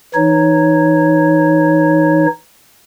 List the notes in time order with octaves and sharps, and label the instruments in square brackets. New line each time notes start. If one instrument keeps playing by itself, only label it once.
[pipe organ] E3 D#4 C#5